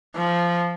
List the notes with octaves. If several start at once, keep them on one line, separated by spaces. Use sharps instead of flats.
F3